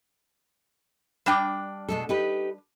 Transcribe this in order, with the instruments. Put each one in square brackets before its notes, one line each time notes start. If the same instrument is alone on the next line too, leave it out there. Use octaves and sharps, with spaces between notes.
[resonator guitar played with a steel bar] G3 D4 G5
[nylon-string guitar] B2 G#3 A4
D#4 G4 B4